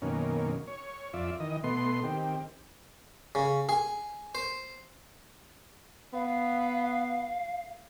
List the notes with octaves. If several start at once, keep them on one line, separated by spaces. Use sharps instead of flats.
F#2 B2 D#3 A#3 C#4
C#5
F2 F4 D5 E5
D#3 E3 D#5
B2 A3 B3 C6
D#3 C4 G4
C#3
G#4
C5
B3 F5